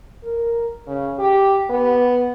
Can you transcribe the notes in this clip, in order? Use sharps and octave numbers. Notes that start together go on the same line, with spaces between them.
A#4
C#3
G4
B3